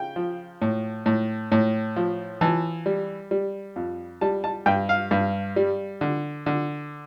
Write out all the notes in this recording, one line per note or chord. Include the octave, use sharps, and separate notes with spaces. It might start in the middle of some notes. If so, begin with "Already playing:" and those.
Already playing: C#3 G5
F3
A2
A2
A2
F3
E3 A5
G3
G3
F2
G3 A5
A5
G2 G5
F5
G2
G3
D3
D3